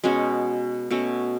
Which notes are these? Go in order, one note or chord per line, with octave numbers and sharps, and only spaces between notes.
B2 G#3 C#4 F#4
B2 A3 C#4 F#4